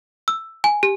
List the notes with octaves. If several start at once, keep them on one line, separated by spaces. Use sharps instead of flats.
E6
G#5
G4